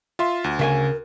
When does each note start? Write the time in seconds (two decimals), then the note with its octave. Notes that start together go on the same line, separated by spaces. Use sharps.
0.19 F4 E5 C6
0.44 D2
0.59 C#3 A#4 E5 G#5